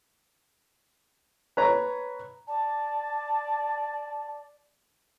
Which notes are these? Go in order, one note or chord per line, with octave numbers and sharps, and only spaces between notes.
B4 C#5 A#5
D5 A5